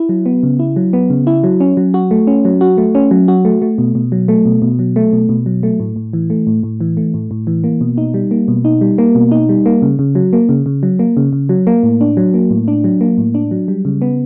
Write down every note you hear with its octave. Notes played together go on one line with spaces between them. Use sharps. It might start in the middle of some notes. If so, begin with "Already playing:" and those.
Already playing: E4
F#3
B3
C#3
E4
F#3
B3
C#3
E4
F#3
C#4
F#3
F#4
A3
C#4
F#3
F#4
A3
C#4
F#3
F#4
A3
A3
B2
B2
F#3
A3
B2
B2
F#3
A3
B2
B2
F#3
A3
A2
A2
E3
A3
A2
A2
E3
A3
A2
A2
E3
A#3
B2
D#4
G3
A#3
B2
D#4
G3
A#3
B2
D#4
G3
A#3
C#3
C#3
F#3
A#3
C#3
C#3
F#3
A#3
C#3
C#3
F#3
A#3
A2
D4
F#3
A#3
A2
D4
F#3
A#3
A2
D4
F#3
G3
C#3
B3